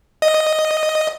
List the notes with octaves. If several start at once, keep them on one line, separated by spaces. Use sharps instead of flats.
D#5